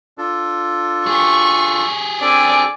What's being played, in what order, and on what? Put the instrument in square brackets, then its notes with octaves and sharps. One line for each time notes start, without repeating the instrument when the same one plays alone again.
[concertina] D4 F4 A4
[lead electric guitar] G4 G#4 [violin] C#6
[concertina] C4 D4 A4 [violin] D5 G#5